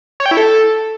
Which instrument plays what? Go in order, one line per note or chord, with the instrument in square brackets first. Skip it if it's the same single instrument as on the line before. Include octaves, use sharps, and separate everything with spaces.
[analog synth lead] C#5
G5
E4
A4